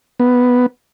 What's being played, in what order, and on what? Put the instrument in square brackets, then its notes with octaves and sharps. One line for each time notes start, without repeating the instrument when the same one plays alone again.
[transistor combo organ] B3